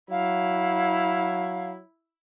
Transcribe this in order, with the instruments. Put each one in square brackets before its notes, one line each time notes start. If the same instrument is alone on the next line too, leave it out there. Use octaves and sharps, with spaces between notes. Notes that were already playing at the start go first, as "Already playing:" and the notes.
[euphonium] F#3 [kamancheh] E4 [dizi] F5